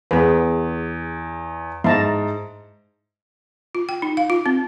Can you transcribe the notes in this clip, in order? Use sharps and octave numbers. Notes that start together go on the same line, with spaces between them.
E2 B3 G#4 B4
G#2 E4 A5 A#5
F4
G5
D#4
F5
F4
C4